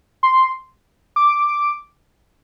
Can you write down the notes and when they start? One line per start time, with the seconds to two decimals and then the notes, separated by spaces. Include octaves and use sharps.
0.23 C6
1.16 D6